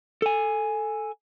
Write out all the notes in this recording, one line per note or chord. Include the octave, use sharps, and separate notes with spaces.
A4 G#5